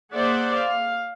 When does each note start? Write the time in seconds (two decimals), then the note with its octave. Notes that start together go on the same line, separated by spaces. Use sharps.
0.14 A#3 G#4 C5 D5 E5 F#5
0.56 F5